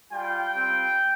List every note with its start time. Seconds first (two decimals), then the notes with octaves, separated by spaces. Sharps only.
0.12 G3 F4 G5
0.54 G3 C4 F4